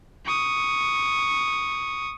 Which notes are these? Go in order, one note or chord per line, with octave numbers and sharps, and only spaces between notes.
C#6 D#6